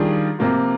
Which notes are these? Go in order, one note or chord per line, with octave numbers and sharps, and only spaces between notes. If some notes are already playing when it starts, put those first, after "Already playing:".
Already playing: D#3 G3 D4 F4 G#4
C3 F3 A#3 F4